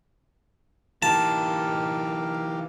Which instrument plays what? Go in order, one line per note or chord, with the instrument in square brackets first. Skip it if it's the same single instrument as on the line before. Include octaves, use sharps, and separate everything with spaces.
[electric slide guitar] E3 D#4 [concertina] A#3 G4 F5 [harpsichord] A5